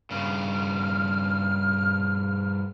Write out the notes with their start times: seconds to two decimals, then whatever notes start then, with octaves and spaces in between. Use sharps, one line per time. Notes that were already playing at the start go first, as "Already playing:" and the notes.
0.11 G2 C#3 F6